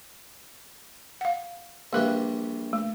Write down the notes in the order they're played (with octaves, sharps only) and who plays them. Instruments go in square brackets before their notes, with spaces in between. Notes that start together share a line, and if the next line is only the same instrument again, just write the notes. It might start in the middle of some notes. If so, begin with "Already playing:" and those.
[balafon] F5 F#5
[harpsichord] A#1 E3 G3 [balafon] A#3 A#4
[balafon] A3